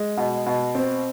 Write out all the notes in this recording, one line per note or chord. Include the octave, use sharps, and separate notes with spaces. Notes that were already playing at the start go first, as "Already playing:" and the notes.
Already playing: G#3
B2
B2
C4